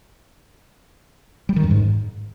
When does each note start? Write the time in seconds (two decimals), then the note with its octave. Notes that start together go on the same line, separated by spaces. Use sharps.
1.49 G3
1.56 D#3
1.64 F#2
1.71 G#2